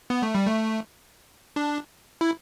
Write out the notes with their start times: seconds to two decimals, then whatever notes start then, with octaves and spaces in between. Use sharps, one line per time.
0.10 B3
0.22 A3
0.35 G3
0.46 A3
1.56 D4
2.21 E4